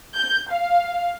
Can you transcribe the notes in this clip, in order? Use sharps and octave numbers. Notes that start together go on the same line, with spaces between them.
G6
F5